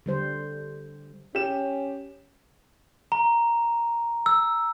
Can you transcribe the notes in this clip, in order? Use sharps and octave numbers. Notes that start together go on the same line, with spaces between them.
D3 G3 C5
C#4 G4 E7
A#5
E6